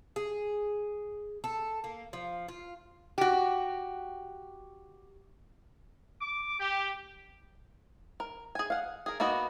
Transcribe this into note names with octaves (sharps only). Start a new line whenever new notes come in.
G#4
A4
A#3
F3
F4
F#4 G4
D6
G4
A#4
G#4 G#5
F5 F#5
G#4 A#4
A#3 B3 D#4 F#4